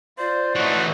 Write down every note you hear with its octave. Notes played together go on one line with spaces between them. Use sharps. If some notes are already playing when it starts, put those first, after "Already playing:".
F4 C5 D5
E3 A3 F#4 C#5 D#5